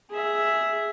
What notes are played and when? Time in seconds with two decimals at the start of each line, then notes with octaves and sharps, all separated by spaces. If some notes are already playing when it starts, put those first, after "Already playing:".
0.11 G#4 E5